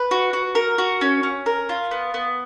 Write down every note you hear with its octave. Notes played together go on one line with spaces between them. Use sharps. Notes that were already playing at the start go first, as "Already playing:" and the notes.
Already playing: B4
F#4
F#4
A#4
F#4
C#4
C#4
A#4
F4
B3
B3